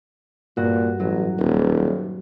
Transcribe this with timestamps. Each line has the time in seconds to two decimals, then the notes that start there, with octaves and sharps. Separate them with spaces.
0.57 G2 A#2 F#4
1.00 A1 F#3
1.39 D#1